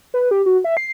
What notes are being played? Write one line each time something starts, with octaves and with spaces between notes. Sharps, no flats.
B4
G4
F#4
E5
C7